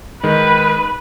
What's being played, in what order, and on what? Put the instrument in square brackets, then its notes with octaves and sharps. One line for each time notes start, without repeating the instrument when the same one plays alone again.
[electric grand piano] D#3 G#3 [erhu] B4